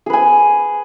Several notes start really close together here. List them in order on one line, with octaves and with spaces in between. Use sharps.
G#4 B4 G#5